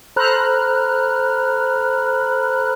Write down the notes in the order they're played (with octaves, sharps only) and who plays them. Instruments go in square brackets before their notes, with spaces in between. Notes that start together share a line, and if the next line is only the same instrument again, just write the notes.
[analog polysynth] A4 C5 A#5 B5 F6 F#6